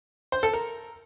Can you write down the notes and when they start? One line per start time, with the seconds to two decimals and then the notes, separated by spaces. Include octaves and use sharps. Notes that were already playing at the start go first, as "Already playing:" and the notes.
0.32 C5
0.43 A4
0.54 A#4